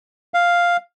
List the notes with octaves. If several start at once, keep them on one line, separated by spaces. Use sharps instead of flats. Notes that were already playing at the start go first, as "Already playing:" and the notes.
F5